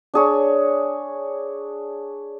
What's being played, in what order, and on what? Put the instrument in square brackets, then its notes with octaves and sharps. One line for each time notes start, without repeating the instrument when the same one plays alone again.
[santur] D4 G#4 C#5